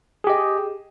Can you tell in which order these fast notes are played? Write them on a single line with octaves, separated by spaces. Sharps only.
G#4 G4 D#5